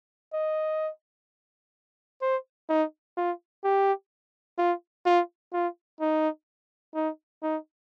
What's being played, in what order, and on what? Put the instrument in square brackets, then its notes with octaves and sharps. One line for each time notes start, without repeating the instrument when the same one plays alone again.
[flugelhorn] D#5
C5
D#4
F4
G4
F4
F4
F4
D#4
D#4
D#4